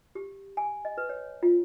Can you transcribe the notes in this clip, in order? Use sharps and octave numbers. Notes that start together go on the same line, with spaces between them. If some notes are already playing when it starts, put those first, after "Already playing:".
G4
G#5
D#5
B4
C#5
F4